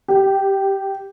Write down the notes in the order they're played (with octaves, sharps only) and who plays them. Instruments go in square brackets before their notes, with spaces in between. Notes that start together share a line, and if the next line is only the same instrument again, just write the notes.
[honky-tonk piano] G4